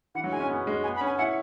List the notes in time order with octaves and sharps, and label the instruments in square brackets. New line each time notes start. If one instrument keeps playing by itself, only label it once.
[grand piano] E3 [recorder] F#5
[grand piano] F#3
[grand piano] G#3 [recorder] G#5
[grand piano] C#4
B3
G#3
[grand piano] B3 [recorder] G#5
[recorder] B5
[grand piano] C#4
[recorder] G#5
[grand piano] E4 [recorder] F#5